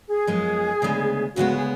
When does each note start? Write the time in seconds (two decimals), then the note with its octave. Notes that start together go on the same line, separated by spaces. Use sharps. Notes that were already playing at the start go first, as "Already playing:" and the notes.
0.09 G#4
0.27 F#2 F3 G#3 B3
0.82 D2 C#3 G#3 B3
1.36 D2 C#3 G#3 B3 F#4
1.55 G#4